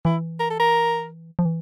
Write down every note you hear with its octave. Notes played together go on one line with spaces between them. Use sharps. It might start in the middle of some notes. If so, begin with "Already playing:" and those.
E3 E4
A#4
A4
A#4
F3
E3